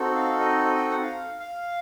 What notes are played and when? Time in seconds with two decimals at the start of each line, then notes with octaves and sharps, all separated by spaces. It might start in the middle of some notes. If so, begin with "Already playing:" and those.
Already playing: C4 D#4 F#4 A4
0.15 F5
0.40 D#5
0.65 D#5
0.77 G5
0.90 F#5
1.03 F5
1.40 F5